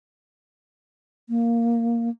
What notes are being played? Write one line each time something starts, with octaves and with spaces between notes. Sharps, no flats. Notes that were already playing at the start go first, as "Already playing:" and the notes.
A#3